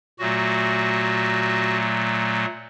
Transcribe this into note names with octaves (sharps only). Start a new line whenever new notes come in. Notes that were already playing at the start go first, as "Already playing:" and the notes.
A#2 F#3 A3 F#4